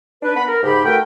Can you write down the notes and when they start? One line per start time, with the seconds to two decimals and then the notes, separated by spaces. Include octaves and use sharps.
0.23 D4 B4
0.36 B3 F#5 B5
0.48 A#4
0.63 G#2 C#3 G4 B5
0.85 A3 F#4 A#4 B4 G5